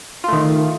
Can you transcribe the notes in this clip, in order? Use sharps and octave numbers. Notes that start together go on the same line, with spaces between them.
D#3 A3 F4